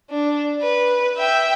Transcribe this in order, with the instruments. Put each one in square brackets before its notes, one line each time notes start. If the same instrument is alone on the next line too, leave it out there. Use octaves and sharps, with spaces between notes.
[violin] D4
B4
E5 G5